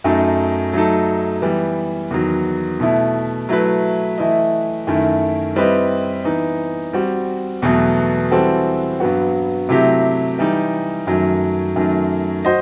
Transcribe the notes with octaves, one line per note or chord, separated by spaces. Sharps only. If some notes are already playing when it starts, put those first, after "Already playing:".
F#2 F#3 A3 D#4
F#3 A3 D#4 A4
E3 G3 B3
E2 D#3 F#3
B2 A3 E4
F#3 A3 E4 B4
E3 A3 E4 B4 D#5
F#2 D#3 A3 E4
G3 C4 E4 B4 D#5
E3 B3 D#4
G3 C4 F#4
E2 B2 F#3 A3
E3 G3 C4 F#4 A4
G2 F#3 B3 F#4
C3 F#3 A3 E4 G4
E3 G3 D#4
F#2 D#3 F#3 A3
F#2 D#3 F#3 A3
F#4 C5 D#5